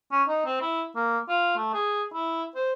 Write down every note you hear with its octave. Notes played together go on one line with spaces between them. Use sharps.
C#4
D#4
C4
E4
A#3
F4
A3
G#4
E4
C5